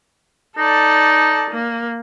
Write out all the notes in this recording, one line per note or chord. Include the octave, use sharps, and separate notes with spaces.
D#4 A4 D5
A#3